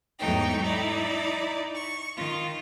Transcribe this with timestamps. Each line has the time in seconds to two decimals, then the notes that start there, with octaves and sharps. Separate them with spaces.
0.19 E2 G#2 F#3 A3 D#4 G5
0.62 D#4 E4 D5
1.74 C#6
2.16 D#3 F4